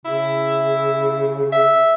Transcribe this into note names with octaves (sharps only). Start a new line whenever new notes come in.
C#3 E4
E5